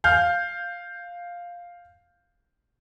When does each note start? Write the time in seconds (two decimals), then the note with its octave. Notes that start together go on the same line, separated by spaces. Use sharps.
0.04 F5 F6 G6